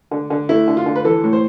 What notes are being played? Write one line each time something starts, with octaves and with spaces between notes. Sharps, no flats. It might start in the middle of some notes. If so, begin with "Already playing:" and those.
D3
D3
A3 E4
D3
F4
D3
B4
E3 A4
A2
C5